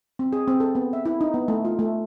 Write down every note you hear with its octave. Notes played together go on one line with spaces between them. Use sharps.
C4
G#4
C4
A4
B3
E5
E4
D#4
B3
A3
F4
A3